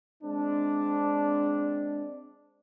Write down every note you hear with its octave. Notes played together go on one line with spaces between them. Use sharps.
G#3 C4 D4